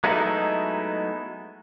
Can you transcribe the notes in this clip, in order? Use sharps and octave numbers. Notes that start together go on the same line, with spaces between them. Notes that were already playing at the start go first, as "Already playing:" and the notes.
F#3 G#3 A3 B3 D#4 E4